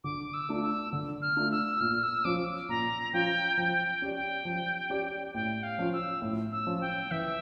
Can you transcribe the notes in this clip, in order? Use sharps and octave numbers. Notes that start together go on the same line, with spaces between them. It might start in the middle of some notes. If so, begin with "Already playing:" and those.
D3 D6
E6
A3 D4 F4
E6
D3
F6
A3 D4 F4
E6
A#2 F6
E6
F3 C#4 F4 D6
A#2 A#5
F3 C#4 F4 G5
F3 G5
G5
C#4 G4 D5
G5
F3
C#4 G4 D5
A2 G5
F5
F3 C#4 F4
E6
A2
E6
F3 C#4 F4
G5
E3 E5